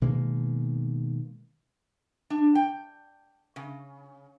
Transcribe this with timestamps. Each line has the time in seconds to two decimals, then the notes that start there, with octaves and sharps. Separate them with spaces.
0.02 B2 D#3 G#3 A#3
2.30 D4
2.55 G5
3.56 C#3